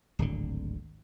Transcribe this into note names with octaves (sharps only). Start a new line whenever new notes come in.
D1 G#1 D3